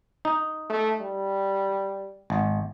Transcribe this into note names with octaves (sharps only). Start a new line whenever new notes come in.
D#4
A3
G3
G#1